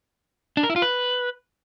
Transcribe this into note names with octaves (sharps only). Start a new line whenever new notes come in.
D4
A#4
E4
F4
B4